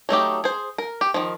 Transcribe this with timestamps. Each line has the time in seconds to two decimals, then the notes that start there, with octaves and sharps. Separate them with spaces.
0.09 F#3 A3 D#4 G4
0.44 G#4 C5
0.78 A#4
1.01 G4
1.14 D#3 F3